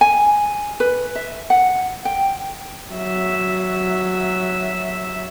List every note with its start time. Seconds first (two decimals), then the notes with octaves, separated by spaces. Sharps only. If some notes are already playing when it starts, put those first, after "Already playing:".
0.01 G#5
0.80 B4
1.16 E5
1.50 F#5
2.05 G5
2.92 F#3 E5